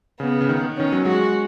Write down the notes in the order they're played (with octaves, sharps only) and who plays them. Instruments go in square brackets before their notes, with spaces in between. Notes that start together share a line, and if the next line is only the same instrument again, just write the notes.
[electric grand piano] C#3 [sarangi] B3
[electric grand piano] C#3
D#3
[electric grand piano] D#3 [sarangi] C#4
[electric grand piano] F#3
[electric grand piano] G#3 [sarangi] F#4